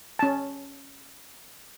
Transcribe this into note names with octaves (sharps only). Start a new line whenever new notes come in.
C#4 A5